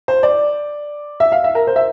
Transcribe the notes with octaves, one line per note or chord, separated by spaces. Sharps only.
C5
D5
E5
F5
E5
A#4
C5
E5